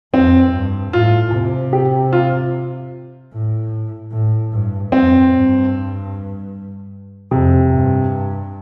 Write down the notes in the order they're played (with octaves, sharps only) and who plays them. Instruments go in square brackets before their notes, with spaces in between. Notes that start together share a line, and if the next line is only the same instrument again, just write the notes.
[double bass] F2 [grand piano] C4
[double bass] G2
[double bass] A2 [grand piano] F4
[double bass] C3
[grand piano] G4
F4
[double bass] A2
A2
G2
[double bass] F2 [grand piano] C4
[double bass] G2
[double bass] F2 [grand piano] C3
[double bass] G2